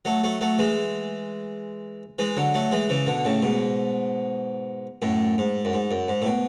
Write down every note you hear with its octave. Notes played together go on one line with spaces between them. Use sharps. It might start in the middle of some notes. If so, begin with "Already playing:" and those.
F#3 A3
F#3 A3
F#3 A3
E3 G#3
E3 G#3
D3 F#3
F#3 A3
E3 G#3
C#3 E3
B2 D3
A2 C#3
G#2 B2
F#2 A2
G#2
F#2
G#2
F#2
G#2
A2
B2